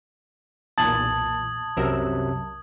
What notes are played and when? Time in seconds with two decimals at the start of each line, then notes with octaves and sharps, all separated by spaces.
0.78 B1 E2 A#2 A5 D#6 G#6 F#7
1.77 C2 F#2 C3 F#3 A#4 E6